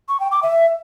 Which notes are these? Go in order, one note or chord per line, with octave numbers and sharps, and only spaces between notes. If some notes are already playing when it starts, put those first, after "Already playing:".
C#6
G5
D6
E5